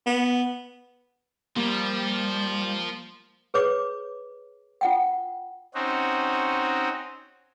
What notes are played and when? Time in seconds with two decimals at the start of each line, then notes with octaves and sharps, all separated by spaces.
0.06 B3
1.57 F3 G3 A#3
3.54 G#4 B4 C#5 D6
4.81 F4 F#5 G5
5.74 C4 C#4 D#4 F#4